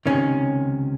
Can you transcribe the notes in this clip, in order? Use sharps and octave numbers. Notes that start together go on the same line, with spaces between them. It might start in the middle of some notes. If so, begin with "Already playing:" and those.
C#2 C3 D#3 C#4